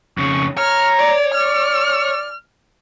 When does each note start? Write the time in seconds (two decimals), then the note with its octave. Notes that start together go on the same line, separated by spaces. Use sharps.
0.18 F2 C#3 C#6
0.57 C#5 A#5 F6
0.98 D5
1.34 D5 F6